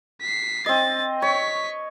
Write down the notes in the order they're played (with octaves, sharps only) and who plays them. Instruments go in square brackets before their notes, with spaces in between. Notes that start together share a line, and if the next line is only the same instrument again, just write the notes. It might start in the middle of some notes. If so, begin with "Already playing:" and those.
[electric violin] B6 C7
[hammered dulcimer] C4 D#5 [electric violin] A6
[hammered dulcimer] C#5 [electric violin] C#6 B6